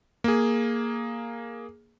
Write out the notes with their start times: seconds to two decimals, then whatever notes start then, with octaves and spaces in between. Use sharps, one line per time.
0.24 A#3 G#4